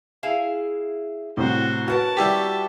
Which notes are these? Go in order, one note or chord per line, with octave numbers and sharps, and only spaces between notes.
E4 G#4 F5
C2 A2 F#4 C5
C#4 F#4 A#4 B4 F#5 A5
G3 E4 G4